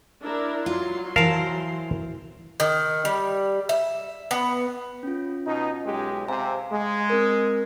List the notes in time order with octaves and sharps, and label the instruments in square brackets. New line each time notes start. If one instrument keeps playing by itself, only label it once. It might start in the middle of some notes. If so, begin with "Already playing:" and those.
[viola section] D4 E4 A#4
[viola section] F#3 C6 [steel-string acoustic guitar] F4
[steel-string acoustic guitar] E3 C5 [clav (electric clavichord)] A#4 F5 A5
[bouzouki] D#3
G3
E5
B3
[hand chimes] C#4 F4
[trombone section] B2 D#4
B1 G#3 G4
[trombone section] C3 C4 [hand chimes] F5 G#5 A#5
[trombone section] G#3
[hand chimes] C4 A#4